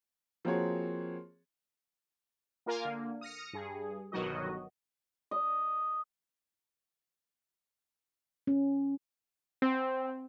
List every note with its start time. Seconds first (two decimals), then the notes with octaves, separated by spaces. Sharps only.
0.45 F3 A#3 C4 F#4 G#4 C#5
2.66 A#3 F4 A#4 F5 G#5
2.85 D3 A#3
3.21 D#6 F6 A#6 C#7
3.53 G2 G#4
4.12 G1 B2 D#3 F#3 F#4 D#5
5.31 D#5
8.47 C#4
9.62 C4